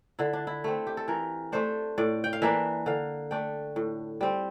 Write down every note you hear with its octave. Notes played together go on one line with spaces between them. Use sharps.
D3 E4
D4
E4
A3 C4
G4
A4
E3 A#4
A3 D4 C5
A2 D5
G5
F5
E3 A#3 D4 E5
D3 F5
A3 D4 G5
A2
G3 C4